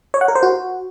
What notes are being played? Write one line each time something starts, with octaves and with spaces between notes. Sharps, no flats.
C#5
F#5
A#4
C5
F#4